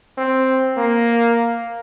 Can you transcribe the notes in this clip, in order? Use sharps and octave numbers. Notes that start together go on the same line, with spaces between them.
C4
A#3